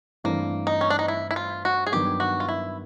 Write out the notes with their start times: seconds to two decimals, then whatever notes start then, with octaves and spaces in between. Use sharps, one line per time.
0.24 G2 E3 A3 A#3 C4 E4
0.67 D#4
0.81 C#4
0.90 D4
0.99 D#4
1.08 E4
1.31 E4
1.36 F4
1.65 F#4
1.87 G#4
1.92 G2 D#3 F#3 B3 G4
2.20 F#4
2.40 F4
2.49 E4